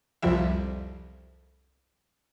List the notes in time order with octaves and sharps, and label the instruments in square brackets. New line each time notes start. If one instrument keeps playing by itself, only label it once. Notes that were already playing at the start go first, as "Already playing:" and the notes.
[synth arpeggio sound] C2 F2 F3 G3 E5